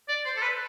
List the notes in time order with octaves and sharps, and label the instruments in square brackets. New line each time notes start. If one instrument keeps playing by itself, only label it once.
[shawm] D5
C5
A4
B4